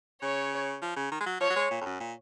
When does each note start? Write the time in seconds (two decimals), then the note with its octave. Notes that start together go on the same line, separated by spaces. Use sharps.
0.22 C#3 C#5
0.82 F3
0.96 C#3
1.12 D#3
1.20 G#3
1.26 F#3
1.40 F3 C#5
1.50 F#3
1.56 G#3
1.71 A#2
1.81 F2
1.85 F#2
2.00 A#2